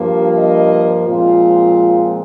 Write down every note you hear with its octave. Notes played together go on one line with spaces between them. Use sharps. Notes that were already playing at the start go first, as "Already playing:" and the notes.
Already playing: G2 F3 A#3
D#5
A#2 F3 G#3 C4 F4